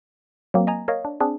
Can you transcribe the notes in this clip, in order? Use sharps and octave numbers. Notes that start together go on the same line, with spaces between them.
F#3 A#3 C4
D#5 G#5 A#5
A#4 C#5 D#5 F5
D4
C4 D4 G#4